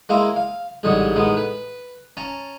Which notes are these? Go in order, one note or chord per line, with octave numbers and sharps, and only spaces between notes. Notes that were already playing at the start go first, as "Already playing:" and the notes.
G#3 A#3 E4 F5 A#5 C6
F5
A1 G#2 D3 G3 C#5 D#5
A2 D#3 G#3 B3
B4
C#4 A5 A#5